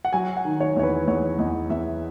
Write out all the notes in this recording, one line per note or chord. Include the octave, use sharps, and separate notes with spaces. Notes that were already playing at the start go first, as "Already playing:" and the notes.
F#5
F#3 G#5
F#5
D#3
C#5
E2 C#5
B4
E2 C#5
E2 D#5
E2 E5